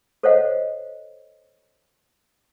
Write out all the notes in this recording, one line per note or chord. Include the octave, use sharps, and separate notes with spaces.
A4 C5 C#5 D#5 F5 F#5